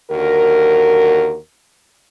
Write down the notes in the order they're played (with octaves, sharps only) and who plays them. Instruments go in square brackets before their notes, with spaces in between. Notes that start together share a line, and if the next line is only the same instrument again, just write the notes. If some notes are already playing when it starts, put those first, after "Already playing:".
[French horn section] D#2 D3 F#4 A#4